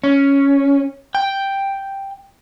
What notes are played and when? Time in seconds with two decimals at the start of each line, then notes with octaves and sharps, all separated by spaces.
0.04 C#4
1.15 G5